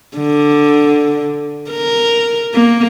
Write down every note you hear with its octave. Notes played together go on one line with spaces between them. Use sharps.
D3
A#4
A#3